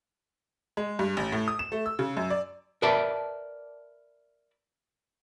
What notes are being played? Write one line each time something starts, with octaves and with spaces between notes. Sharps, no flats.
G#3
G2
A1
A2
D#6
E7
A3
E6
C#3
F#2
D5
A#4 B4 D5 E5 A5